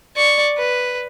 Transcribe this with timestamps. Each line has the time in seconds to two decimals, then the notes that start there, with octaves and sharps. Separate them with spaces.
0.16 D5 C#6
0.58 B4